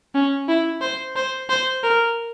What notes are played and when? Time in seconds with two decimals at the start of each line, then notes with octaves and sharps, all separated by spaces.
0.15 C#4
0.49 E4
0.81 C5
1.16 C5
1.49 C5
1.84 A#4